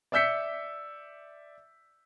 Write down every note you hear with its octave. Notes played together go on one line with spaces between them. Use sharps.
D5 E5 E6 G6 B6 C#7